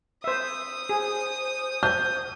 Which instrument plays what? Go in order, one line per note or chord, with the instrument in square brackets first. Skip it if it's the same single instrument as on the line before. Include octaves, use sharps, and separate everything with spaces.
[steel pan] C5 E5 [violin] D#6
[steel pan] G#4 [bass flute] C5
[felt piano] G6